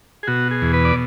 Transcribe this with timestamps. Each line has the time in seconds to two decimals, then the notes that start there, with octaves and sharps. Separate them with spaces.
0.23 G#4
0.27 B2 F#4
0.51 G#4
0.62 E2
0.74 B4
0.85 D5